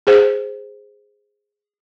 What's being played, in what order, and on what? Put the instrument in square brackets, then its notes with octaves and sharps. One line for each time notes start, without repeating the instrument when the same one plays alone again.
[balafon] G#4 C5